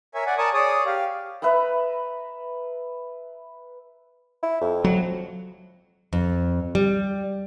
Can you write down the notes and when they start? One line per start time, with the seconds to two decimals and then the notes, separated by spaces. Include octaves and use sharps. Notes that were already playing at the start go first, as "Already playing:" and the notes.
0.15 A#4 C#5 E5 G#5
0.26 D5 F#5 G#5
0.38 A#4 D5 G#5 A5 C#6 D#6
0.53 G#4 C#5 D5 D#6
0.86 G4 F5
1.42 B4 E5 A#5 B5
4.43 E4
4.61 F2
4.84 F#3
6.13 F2
6.75 G3